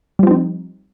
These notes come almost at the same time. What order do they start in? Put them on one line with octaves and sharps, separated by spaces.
G3 F3 C4 D#4